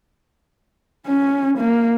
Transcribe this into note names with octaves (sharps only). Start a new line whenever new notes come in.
C#4
A#3